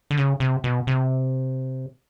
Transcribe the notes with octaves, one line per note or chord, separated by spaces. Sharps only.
D3
C#3
C3
B2
C3